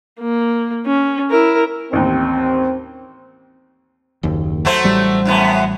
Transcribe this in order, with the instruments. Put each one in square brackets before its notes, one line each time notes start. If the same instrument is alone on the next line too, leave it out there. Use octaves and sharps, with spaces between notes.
[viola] A#3
C#4
E4 A#4
[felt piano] A1 D#2 [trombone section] C4
[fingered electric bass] F#1 D#2
[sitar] F#3 A3 C5
[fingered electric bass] A1 G3
[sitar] F#2 A2 B3